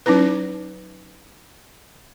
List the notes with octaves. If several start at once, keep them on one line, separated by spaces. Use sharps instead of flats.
F#3 C#4 D#4 E4 B4